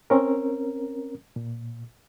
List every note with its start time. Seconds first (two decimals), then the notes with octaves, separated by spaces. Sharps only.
0.10 C4 C#4 A#4
1.36 A#2